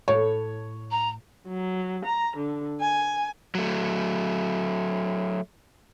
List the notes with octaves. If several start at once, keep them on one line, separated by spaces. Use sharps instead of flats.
A2 C#5
A#5
F#3
A#5
D3
G#5
F#3 A3